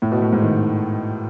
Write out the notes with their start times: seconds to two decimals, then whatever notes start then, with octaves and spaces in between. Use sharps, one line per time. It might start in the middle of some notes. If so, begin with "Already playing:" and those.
0.02 A2
0.12 B2
0.22 A2
0.32 G#2
0.42 D#3